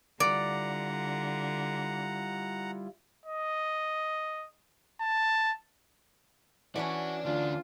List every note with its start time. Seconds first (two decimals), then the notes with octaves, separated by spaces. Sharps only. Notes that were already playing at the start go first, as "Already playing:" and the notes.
0.20 D3 G3 E4 F4 D5 F#5 A#5
3.26 D#5
5.01 A5
6.76 E3 C#4 F#4 D5 E5 A5
7.25 D2 D4 F4